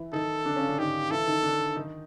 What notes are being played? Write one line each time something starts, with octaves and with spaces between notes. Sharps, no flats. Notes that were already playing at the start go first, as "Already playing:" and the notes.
Already playing: E3 E4
D#3 D#4 A4
D3 D4
C#3 C#4
D3 D4
D#3 D#4 G4
E3 E4 A4
D#3 D#4
D3 D4
D#3 D#4